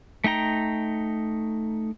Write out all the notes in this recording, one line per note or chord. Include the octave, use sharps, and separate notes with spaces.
A3 D#4 G5 A#5